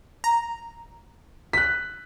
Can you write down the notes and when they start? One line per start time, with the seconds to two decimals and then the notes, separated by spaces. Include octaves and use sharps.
0.24 A#5
1.53 F#6 B6